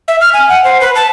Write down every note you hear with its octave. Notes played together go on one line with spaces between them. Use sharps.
E5
F6
G#5
F#5
C5
B4
A5